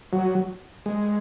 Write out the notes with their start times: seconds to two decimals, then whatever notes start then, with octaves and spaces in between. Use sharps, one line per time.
0.13 F#3
0.86 G#3